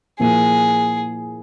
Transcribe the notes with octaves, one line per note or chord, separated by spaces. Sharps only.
A#2 F3 A#3 E4 G#4